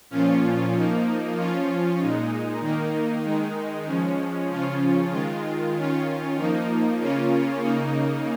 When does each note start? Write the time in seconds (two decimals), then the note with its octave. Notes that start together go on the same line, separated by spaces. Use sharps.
0.10 A#2 F3 C#4 F4
0.73 F3 A#3 D#4
1.36 F3 C#4 F4
1.99 A#2 G#3 D#4
2.61 D#3 A#3 D#4
3.23 D#3 G#3 D#4
3.86 F3 G#3 C#4
4.49 C#3 F3 C#4 F4
5.12 D#3 G#3 F4
5.74 D#3 C#4 F4
6.37 F3 A#3 D#4
6.99 C#3 A#3 C#4 F4
7.62 C#3 A#3 D#4